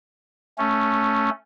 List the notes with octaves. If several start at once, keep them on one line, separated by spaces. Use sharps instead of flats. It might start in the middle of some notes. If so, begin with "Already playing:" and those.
A3 C#4